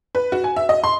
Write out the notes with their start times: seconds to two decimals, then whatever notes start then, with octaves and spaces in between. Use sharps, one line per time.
0.15 B4
0.32 F#4
0.44 G#5
0.56 E5
0.69 D#5
0.84 C6